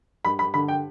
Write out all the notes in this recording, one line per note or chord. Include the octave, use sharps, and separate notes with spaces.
G2 B5
B5
D3 B5
G5